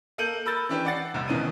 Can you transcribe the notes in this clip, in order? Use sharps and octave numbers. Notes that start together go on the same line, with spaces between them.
A#3 A4 G6 D#7 F#7
A#4 B5 E6 G6 A6
E3 C#4 D4 G4 B4
D5 F#5 A6 C7
F1 C2
G#1 B2 D#3 E3 C#4 D#7